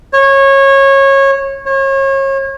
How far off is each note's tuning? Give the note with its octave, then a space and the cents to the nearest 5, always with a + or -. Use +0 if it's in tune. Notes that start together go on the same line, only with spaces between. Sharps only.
C#5 -20
C#5 -35